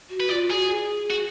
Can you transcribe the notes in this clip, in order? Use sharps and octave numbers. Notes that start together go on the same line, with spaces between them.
F#4
B4
F4 D5
F#4 G#4
G#4
F#4